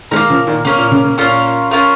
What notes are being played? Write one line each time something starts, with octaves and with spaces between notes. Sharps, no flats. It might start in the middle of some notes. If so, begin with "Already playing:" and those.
D#3 G#3 A#3 C#4 A#4
C#3 F3
A#2 D#3
C#3 A#3 C#4 A#4
A#2
C#3
C#3
A#2 C#4 F4 A#4
C#4 F4 A#4